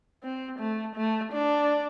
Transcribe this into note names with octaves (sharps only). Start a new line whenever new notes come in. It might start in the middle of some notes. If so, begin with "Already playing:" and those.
C4
A3
A3
D4